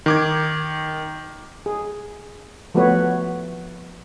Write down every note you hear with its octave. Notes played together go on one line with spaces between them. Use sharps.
D#3 D6 G#6
G#4
F3 A3 B3 F#4 B4 C#5